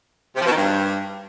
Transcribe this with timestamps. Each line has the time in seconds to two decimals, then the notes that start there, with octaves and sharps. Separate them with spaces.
0.36 C3
0.41 F3
0.46 B2
0.51 D#3
0.56 G2